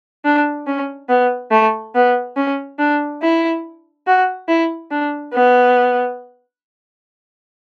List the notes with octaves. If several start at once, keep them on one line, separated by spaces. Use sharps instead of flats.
D4
C#4
B3
A3
B3
C#4
D4
E4
F#4
E4
D4
B3